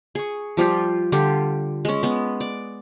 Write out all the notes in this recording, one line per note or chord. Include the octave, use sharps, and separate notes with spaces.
G#4 C#6
F3 G3 F4 G4
D3 G3 F4 G4
G#3 C#4
G#3 B3
D5